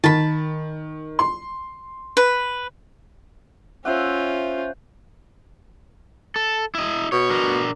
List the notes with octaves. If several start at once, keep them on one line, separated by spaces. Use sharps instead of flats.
D#3 A5 B5
C6
B4
C#4 F4 C5 E5 F#5
A4
E4 D#5
B2 C#5
D4 A#4